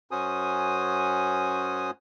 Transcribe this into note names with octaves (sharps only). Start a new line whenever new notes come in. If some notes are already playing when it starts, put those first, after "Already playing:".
F#2 C#4 F#4 C5 G#5 D#6